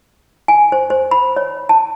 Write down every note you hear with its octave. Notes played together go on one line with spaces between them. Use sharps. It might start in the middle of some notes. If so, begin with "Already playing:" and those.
G#5
C5
C5
B5
C#5
A5